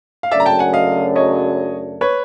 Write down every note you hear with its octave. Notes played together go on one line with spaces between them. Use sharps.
F5
F#2 C#3 F#3 A3 D4 D5 E5
A#5
G5 A5
F#5 G#5
D#5 F5
C#5 D#5
B4 C#5